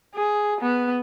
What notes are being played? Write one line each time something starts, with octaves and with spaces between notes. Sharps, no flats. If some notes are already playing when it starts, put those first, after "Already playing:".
G#4
B3